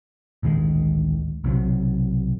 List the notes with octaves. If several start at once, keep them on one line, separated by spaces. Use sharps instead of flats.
A1 D2 D#3 G#3
B1 C3 F#3